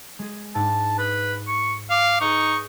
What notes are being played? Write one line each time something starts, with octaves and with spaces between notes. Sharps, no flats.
G#3 G#4
G#2 D4 A5
B4 D#6
C#6
F5 D6
D#4 G#4 B4 C#6